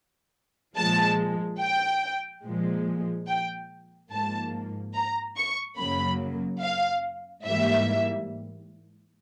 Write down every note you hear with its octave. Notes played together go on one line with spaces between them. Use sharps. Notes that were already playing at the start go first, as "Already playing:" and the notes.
A#2 F3 G#3 A5
G5
A#2 F3 G#3
G5
G#2 F3 A#3 A5
A#5
C#6
F#2 C#3 F#3 A#3 B5
F5
G#2 E3 G3 A#3 E5